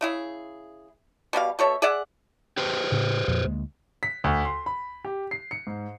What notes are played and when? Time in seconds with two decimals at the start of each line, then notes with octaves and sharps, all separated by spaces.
0.01 C#3 E4 G#4
1.33 B2 G3 E4 F5
1.59 B2 A4 C#5 E5
1.82 G#4 D5 E5 F#5
2.57 G4 B4 C5
2.92 A2 C#3
3.28 F2 A#2 F3
3.44 D2 G#3 A#3
4.03 B6
4.24 D2
4.45 C6
4.66 B5
5.05 G4
5.31 C7
5.51 C#7
5.67 G#2